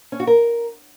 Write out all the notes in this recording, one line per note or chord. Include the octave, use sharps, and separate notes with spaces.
C#4
F#4
A#4